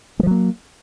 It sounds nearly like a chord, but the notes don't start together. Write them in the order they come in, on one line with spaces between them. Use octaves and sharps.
G#3 F3 F#3 A#3